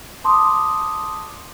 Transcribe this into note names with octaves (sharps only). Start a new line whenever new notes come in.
A5 C6 D6 D#6